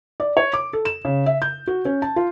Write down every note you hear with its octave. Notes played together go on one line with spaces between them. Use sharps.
D5
C#5
D6
A4
E7
C#3
E5
G6
F#4
C#4
A5
F4